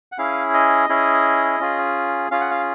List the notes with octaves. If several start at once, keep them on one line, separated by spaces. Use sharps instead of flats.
F#5
C#4 E4 G#4 F5
D#5
C#4 E4 G#4
C#4 F4 G#4
C#4 F4 G#4 F5
F#5
F5